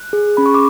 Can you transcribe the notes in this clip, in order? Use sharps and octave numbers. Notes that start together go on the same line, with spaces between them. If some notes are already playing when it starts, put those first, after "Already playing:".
Already playing: F#6
G#4
C#4 B5
C#6
D6